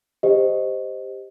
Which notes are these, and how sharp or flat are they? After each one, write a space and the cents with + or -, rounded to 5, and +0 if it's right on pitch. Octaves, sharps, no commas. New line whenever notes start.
G4 +5 C5 +0 D#5 +0